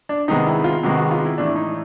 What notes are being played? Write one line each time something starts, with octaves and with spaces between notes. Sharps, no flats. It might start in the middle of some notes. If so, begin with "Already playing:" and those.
D4
C3 D#3 G#3 B3 D#4
E4
F4
C3 D#3 G#3 B3 F#4
F#4
F4
E4
A2 E3 A3 D4
D#4